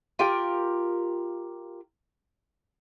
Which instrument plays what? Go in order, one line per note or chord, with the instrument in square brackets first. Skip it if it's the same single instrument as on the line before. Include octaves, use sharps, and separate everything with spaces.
[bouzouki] F4 G4 A#4 G5